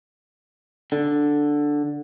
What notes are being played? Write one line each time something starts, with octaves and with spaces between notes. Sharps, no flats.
D3